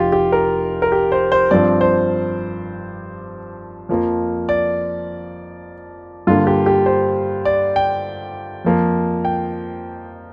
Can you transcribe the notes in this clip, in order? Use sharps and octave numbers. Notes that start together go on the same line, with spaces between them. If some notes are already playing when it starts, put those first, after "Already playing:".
Already playing: F1 F2 F4 G4
G4
A#4
A#4
G4
C5
C5
G2 F3 C4 D5
C5
F2 F3 A#3
D5
G2 D3 A#3 F4
G4
G4
C5
D5
G5
F2 F3 A#3
G5